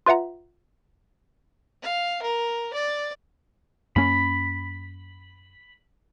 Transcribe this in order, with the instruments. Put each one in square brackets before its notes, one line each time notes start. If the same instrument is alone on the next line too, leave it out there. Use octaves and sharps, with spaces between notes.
[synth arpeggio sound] F4 B4 E5 F#5 A#5
[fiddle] F5
A#4
D5
[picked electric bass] F#2 A#3 C#4 [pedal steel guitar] B5